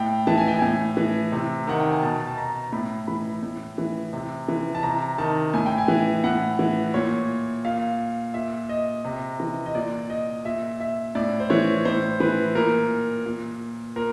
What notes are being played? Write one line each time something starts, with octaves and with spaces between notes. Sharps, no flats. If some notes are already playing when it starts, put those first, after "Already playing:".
Already playing: A2 G5
E3 A5
G#5
G5
A2 G#5
E3
C3
D#3 F#5
G5
G#5
B2 A5
A5
A#5
A2 B5
E3 B5
A2
E3
C3
E3
A5
C3 A#5
D#3 A5
A2 G#5
G5
G#5
E3
A2 F#5
E3
A#2 C#5
A#2 F5
A#2 E5
D#5
C3
E3
D#5
A#2 D5
D#5
A#2 E5
E5
A2 D5
C5
E3 C#5
A2 C5
E3 B4
A#2 A#4
A#2
A#2 A#4